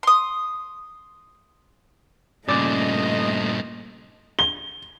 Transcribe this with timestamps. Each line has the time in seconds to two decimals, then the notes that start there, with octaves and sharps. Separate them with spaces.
0.03 C6 D#6
2.48 G2 A#2 C#3 A3 D5 D#5
4.39 G7